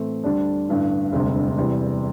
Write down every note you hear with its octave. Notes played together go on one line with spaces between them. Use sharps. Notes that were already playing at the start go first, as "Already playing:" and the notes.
Already playing: A2 E3 A3 C4
D2 D3 G3 D4
A1 G2 D3
E1 D2 C3 G3
E2 C3 G3